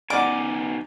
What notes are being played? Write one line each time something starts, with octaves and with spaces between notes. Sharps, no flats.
B3 D#4 D5 F#5 G#5 D6